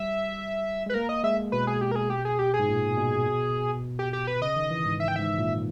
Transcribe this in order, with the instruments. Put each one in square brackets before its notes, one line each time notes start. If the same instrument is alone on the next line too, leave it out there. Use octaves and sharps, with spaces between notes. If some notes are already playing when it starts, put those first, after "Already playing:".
Already playing: [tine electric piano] G3 [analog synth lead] E5
[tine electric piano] G#3
[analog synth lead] B4
[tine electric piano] A#3 [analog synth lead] A#4
[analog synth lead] D#5
[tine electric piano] G#3 [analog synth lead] E5
[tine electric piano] B2 [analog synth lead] B4
[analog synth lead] G#4
G4
A#4
G#4
G4
G#4
G4
G#4
[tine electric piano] G#2
A#2
B2
[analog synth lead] G4
G4
B4
[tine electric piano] C#3 [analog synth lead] D#5
[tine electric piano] D#3
E3
G#2
[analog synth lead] E5
G5
[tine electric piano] G#2 [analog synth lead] E5
[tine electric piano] A#2